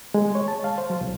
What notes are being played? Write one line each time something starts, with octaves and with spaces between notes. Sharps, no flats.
G#3
C#5
A5
F5
C5
F#3
C2